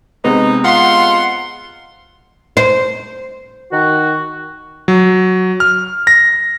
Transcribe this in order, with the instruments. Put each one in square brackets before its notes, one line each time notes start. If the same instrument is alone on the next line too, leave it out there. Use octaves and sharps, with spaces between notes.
[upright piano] C3 G#3 B3 [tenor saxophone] D#4
[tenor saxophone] F4 [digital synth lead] F#5 [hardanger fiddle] C6
[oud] C5
[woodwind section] D#3 F#4
[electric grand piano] F#3
F6
A#6